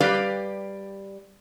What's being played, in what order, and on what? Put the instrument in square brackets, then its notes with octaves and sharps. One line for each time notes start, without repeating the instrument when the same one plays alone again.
[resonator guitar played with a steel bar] G3 G4 B4 D5 F5